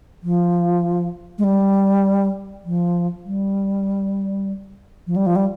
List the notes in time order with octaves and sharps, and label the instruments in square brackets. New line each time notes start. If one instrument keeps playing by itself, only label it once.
[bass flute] F3
G#3
G3
F3
G3
F3
G3
F3
G3